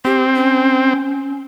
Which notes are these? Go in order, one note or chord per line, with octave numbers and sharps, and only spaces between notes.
C4 G4
C#4